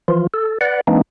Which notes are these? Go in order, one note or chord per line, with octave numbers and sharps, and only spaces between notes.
E3 F3 F4
A4
B4 D5 F#5
E3 G#3 A#3 C4 D4 D#4